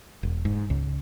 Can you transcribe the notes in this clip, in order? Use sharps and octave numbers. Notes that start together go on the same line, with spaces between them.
E1
G#2
C#2